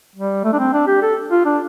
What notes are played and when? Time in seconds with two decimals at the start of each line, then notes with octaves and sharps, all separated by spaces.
0.16 G3
0.44 A3
0.53 D4
0.59 C4
0.73 D4
0.87 G4
1.02 A4
1.31 F4
1.45 D4